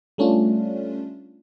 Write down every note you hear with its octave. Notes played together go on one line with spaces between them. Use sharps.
G3 A3 C#4 D4 F4